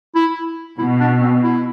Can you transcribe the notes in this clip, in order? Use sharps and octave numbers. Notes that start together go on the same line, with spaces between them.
E4
B2 E4
D4
C4
E4